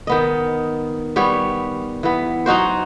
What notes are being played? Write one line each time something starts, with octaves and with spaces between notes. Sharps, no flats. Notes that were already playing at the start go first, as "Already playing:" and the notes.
D#3 B3 D#5
G3 B3 C#5
E3 B3
F#3 D#4 F#4 C5